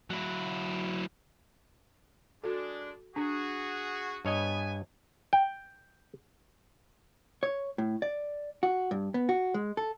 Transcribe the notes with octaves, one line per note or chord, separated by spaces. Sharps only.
F#3 E4
G#3 D4 F#4 A4
D4 F#4 G#4
G2 B3 C#5 D#5 G#5
G5
C#5
A2
D5
F#4
G2
B3
F#4
G#3
A4